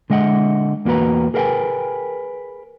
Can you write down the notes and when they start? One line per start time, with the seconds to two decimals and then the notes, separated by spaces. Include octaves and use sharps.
0.10 D3 G#3 D#5 E5 F#5
0.85 E2 A#3 F#4 B4 A#5
1.34 G#4 A#4 B4 F5 G5 G#5